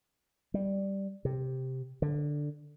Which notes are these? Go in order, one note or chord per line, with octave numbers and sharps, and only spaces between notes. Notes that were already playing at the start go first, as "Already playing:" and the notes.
G3
C3
D3